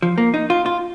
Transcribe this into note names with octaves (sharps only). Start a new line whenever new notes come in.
F3
A#3
D#4
F4
F4